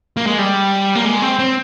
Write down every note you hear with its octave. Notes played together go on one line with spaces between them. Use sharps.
A#3
G#3
G3
A#3
G#3
C4
C4